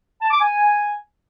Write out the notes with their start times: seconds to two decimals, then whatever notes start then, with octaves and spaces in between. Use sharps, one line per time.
0.21 A5
0.31 D6
0.40 G#5